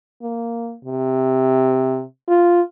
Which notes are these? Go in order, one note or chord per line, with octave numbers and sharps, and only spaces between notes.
A#3
C3
F4